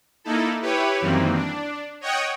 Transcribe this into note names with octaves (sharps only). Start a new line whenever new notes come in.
A#3 D#4 E4 A4
E4 G4 B4 C#5
F#2 D#3 E3 G3 A#3 C4
D4
C#5 D#5 F#5 G5 C#6 D#6